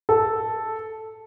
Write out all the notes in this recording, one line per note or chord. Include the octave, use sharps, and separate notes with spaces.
A4